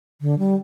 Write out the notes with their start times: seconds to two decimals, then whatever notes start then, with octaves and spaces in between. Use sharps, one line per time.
0.21 D3
0.39 G3